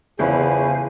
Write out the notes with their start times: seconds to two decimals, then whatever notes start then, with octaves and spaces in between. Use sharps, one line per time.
0.19 G1 E2 C#3 C#4 C5 F5 G#5 B5